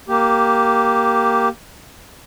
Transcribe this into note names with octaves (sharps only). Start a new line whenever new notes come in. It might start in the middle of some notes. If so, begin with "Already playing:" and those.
A#3 G4